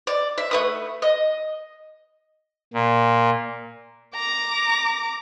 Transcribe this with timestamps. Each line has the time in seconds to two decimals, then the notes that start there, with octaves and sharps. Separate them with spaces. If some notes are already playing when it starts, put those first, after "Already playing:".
0.07 D5
0.38 E5
0.51 A3 B4 D#6
1.02 D#5
2.73 A#2
4.16 A#5 D6